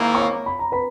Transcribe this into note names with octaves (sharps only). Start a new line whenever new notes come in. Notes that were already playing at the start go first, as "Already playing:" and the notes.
Already playing: G#2 D#3 A#3 E4
C#5 C#6
B5
A#5
B4 B5